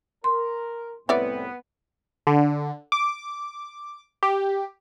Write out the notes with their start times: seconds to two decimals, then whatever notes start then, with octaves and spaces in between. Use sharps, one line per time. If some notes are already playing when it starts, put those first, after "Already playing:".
0.24 A#4 C6
1.09 C2 A2 B3 C4 E4 C#5 D5
2.27 D3
2.92 D6
4.23 G4